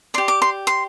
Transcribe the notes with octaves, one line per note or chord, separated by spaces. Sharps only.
G4 D5 C6
D6
C6
C6